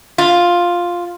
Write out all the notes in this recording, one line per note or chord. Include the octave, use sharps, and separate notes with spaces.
F4